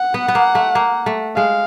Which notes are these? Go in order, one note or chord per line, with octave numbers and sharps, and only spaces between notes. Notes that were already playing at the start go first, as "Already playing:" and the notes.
Already playing: F#5
B3
B3
A#3
A3
A#3
A3
G#3 F5